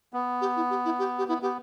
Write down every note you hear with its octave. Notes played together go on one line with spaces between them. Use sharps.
B3
G4
E4
G4
E4
G4
G4
B3 E4
B3 G4